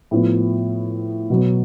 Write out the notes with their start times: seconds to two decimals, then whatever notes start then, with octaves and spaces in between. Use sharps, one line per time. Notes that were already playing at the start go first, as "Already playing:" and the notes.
0.11 A2 F3 B3
1.30 B2 F#3 B3